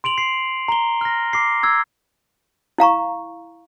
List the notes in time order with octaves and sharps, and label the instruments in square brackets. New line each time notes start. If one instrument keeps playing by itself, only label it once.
[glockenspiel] C6 D7 F7 F#7
C7
A#5 G7
F6 A#6
D6 C7
E6 G#6
[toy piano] E4 F5 A#5 C#6